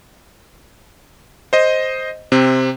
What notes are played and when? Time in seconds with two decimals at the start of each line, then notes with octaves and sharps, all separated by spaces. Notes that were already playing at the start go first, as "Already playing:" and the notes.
1.53 C5 D#5
2.32 C3 C4